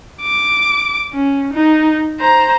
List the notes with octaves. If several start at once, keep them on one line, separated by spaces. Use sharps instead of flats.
D6
C#4
D#4
C5 A#5